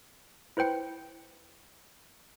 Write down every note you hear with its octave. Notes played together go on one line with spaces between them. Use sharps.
E4 B4 C5 G5 C#7